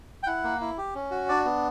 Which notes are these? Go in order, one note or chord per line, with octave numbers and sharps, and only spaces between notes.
G5
E4 F#5
A#3
E4
G4
C#4
F#4
D4 D5
B3